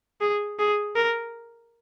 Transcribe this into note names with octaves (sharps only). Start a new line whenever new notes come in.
G#4
G#4
A#4